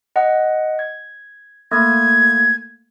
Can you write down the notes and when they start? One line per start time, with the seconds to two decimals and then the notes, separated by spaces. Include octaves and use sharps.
0.16 D#5 F#5
0.79 G#6
1.71 A3 A#3 G#6